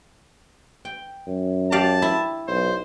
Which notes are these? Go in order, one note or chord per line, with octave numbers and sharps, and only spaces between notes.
G5
F#2
G4 D5 F5 A5
E4
B1 C5